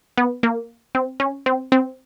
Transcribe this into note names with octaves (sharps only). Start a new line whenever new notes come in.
B3
A#3
C4
C#4
C4
C4